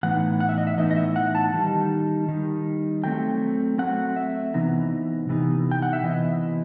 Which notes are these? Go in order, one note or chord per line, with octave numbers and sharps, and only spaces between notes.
A2 E3 B3 D#4 F#5
F#5
E5
D#5
E5
A2 E3 B3 D#4 D#5
D#5
E5
F#5
A5
D#3 G3 D#4
D#3 G3 D#4
F#3 A3 C4 G5
F#3 A3 C4 F#5
E5
C3 E3 B3 D#4
C3 E3 B3 D#4
G5
F#5
E5
C3 E3 B3 E4 D#5